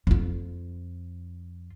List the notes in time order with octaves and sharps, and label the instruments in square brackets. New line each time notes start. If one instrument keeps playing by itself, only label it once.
[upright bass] F2 F4